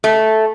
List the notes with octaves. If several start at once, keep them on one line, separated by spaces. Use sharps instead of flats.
A3